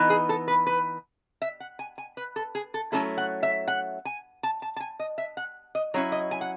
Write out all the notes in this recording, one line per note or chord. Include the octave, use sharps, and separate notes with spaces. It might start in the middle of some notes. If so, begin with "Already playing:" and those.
Already playing: E3 B3 D#4
G#4
A4
B4
B4
E5
F#5
G#5
G#5
B4
A4
G#4
A4
F#3 A3 C#4 E4 A4
F#5
E5
F#5
G#5
A5
A5
A5
G#5
D#5
E5
F#5
D#5
F#3 C#4 E4 C#5
D#5
G#5
F#5